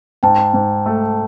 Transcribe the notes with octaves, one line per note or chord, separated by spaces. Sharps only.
G#2 G5 A5
G#2
A3